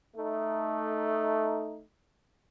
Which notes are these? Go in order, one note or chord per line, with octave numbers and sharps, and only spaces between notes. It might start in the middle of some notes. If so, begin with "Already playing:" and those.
A3 D#4